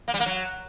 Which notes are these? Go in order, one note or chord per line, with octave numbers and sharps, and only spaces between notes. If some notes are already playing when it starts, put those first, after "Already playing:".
A#3
G3
A#3
F#3